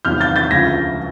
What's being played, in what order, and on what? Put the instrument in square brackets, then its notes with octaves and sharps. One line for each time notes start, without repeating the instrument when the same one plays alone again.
[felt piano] E2 C3 D#3 F#3 [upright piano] F6 G6
[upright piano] G6 A6
G6 A6
[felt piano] D2 C#3 F3 [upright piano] G#6 A#6